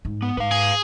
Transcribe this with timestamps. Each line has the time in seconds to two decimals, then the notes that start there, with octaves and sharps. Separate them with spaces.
0.05 G#2
0.22 B3
0.37 G#2 B4 F5
0.51 G#4